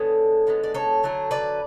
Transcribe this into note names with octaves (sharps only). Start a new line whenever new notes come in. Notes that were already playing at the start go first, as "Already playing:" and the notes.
Already playing: D3 G#3 B3 A4 C#5
D3 G#3 B3
D5
A4 C#5
D3 F#3 A3
B4 D5